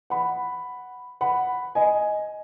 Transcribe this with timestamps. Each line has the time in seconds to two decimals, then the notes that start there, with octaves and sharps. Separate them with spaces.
0.10 F#5 B5
1.21 F#5 B5
1.75 D#5 G#5